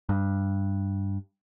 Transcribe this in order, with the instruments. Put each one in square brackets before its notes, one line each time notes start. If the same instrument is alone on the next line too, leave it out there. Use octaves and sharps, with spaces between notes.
[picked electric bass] G2